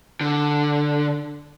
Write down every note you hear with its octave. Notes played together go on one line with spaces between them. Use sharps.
D3